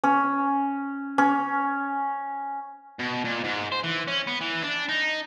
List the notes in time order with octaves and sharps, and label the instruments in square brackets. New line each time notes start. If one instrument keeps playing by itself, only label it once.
[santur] C#4
C#4
[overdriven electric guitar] B2
A#2
G#2
C5
E3
C#4
B3
E3
D4
D#4